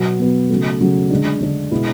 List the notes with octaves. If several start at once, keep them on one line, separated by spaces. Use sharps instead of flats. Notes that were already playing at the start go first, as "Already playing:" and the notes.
Already playing: B2 F#3 B3
B2 F#3 B3
C#3 F#3 A3
C#3 F#3 A3
D3 G#3 D4
D3 G#3 D4
B2 G#3 B3 E4